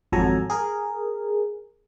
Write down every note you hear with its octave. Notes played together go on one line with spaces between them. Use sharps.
G#1 F2 F#3 A4 G#5 A#5
G#4 A#4